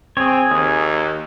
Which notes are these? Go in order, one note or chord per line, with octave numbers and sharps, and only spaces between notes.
C4 G#4 C#5
D#2